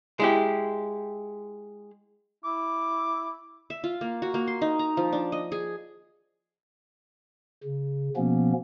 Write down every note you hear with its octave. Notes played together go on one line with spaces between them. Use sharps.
G#3 E4 G4
E4 D6
E5
F4
A#3
F#4
A#3
C6
D#4
A#5
F3
D4
D#5
G#4
C#3
B2 F3 A#3 B3 C#4